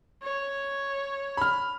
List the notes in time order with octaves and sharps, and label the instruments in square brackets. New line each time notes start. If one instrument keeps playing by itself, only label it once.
[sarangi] C#5
[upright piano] B5 F6